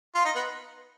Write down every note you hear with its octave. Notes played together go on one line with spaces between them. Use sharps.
F4
D#4
B3